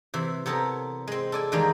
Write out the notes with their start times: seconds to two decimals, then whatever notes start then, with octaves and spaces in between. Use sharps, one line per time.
0.14 C3 E3
0.46 C3 B3 A4 A#4 C#5
1.07 G#3 C4
1.32 A4 D5 G#5
1.52 E2 D#3 G3 G#3 A#3 A#4